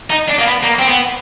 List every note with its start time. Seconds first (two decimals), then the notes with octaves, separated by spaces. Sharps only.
0.10 D#4
0.28 D4
0.39 A#3
0.45 B3
0.63 A#3
0.79 C4
0.88 B3